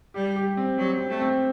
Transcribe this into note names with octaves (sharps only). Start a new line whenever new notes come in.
G3 G4
G4
C4
F#3 G3
C4
A3
C4